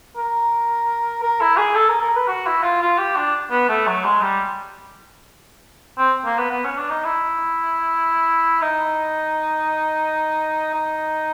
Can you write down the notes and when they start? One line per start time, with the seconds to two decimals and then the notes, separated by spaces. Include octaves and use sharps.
0.17 A#4
1.23 A#4
1.41 E4
1.57 G#4
1.75 A4
1.89 A#4
2.01 A#4
2.16 B4
2.28 F#4
2.47 E4
2.63 F4
2.82 F4
2.98 G4
3.16 D4
3.51 B3
3.69 A3
3.87 F#3
4.04 G#3
4.22 G3
5.98 C4
6.25 A#3
6.38 B3
6.50 B3
6.64 C#4
6.78 D4
6.90 D#4
7.04 E4
8.62 D#4
10.74 D#4